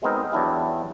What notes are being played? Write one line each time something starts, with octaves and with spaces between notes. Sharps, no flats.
F#3 G#3 B3 C4 D#4 A#4
E2 F#3 D4 E4 G4